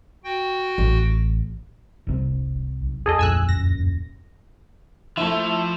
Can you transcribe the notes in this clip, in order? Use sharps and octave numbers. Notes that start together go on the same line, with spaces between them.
F#4 G5
A1
E1 C2 C3 C4
B1
E2 G#4 A4 D#5
D1 B1 F2 A#2 G#5 E6 F#6
F#2 A#6
F3 A3 E4